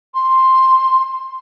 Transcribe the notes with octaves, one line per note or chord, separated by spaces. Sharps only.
C6